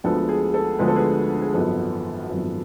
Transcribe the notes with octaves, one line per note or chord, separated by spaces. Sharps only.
D2 D3 F3 G#3 B3 A4
G#4
A4
D2 D3 F3 G#3 B3 B4
A4
G#4 B4
G#4
G#1 F#2 F3 B3 A4
G#1 F#2 F3 B3